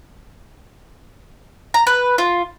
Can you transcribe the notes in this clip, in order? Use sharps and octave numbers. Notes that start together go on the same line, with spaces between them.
A#5
B4
F4